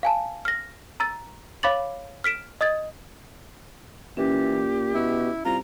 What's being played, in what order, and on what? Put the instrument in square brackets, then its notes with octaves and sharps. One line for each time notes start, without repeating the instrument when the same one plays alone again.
[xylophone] F5 G#5 A5
F6 A#6
A#5 E6 A6
C#5 F5 B5 D6 A6 F#7
F6 B6 D7 E7
D#5 D#6 G#6 A6
[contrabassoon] A#2 [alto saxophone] E3 [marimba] C#4 [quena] G4
[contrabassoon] B2 [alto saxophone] E4
[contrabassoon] C2 [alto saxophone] F4 [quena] A#5